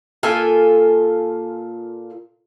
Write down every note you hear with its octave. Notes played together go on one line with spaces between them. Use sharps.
A#2 F4 A4 G#5